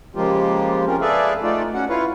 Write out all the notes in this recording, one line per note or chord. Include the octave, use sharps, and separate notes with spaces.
C#3 F3 G#3 A#3 F4 G4
C4 C#4 F4 A#4
G#4 A4 B4 D5 E5 F5
A3 D#4 F4 D5
C#4 F#4 F#5
E4 F4 B4 C#5 F5